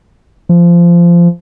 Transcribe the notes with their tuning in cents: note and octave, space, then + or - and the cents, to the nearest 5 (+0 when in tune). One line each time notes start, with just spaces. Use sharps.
F3 -20